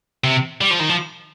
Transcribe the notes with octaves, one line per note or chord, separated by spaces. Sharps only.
C3
G3
F3
D#3
F3